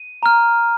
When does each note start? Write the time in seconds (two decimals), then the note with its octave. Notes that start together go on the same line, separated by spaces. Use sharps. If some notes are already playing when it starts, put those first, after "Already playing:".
Already playing: D#7
0.23 A#5 F6